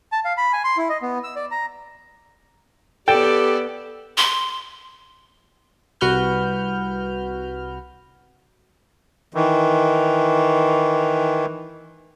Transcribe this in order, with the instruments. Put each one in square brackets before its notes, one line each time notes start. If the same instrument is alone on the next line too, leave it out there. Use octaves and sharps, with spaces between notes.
[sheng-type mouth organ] A5
F5
B5
G#5
C6
E4
D#5
B3
E6
D5
A#5
[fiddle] B3 D5 [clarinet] G4 [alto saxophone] A4 [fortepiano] G5
[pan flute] C6
[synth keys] C2 F#4 B4 F6 G6
[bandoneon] D#3 E3